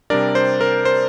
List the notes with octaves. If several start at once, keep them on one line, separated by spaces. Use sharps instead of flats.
C3 G3 D4 A#4 D5
C5
A#4
C5